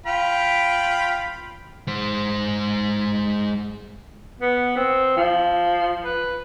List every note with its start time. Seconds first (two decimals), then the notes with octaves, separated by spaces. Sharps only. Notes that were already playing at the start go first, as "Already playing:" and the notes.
0.06 F4 G5 B5
1.87 G#3 C5
4.41 B3
4.77 C4
5.17 F3
6.05 B4